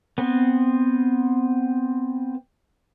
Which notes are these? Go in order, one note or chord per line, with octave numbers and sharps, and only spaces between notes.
B3 C4